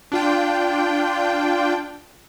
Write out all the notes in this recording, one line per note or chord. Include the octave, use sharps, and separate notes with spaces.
D4 F4 G5